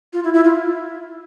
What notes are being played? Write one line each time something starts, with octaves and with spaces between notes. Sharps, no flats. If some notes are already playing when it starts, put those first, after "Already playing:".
F4
E4
E4
F4